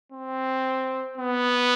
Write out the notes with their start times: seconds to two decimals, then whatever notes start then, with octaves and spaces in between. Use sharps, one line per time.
0.12 C4
1.18 B3